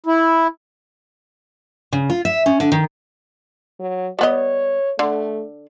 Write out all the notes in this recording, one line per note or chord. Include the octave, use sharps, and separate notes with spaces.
E4
C#3
F4
E5
C#4
D3
D#3
F#3
G3 B3 C#5 D#5
D3 A3